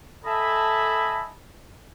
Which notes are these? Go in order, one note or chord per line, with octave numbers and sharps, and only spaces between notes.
A4 D#5 E5 G#5 A5 B5